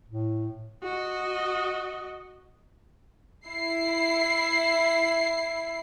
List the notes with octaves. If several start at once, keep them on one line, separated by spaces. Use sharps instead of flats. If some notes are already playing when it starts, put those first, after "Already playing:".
A2
F#4 D#5
E4 C7